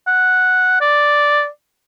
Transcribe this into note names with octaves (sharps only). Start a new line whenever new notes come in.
F#5
D5